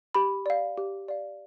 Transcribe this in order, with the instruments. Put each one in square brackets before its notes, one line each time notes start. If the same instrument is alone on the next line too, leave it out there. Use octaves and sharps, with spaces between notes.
[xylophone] G4 B5
D5 F5
G4
D5 F5